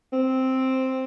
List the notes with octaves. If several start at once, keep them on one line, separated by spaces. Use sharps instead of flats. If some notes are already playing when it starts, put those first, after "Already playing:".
C4